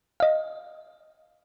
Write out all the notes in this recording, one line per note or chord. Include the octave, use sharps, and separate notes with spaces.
D#5 F5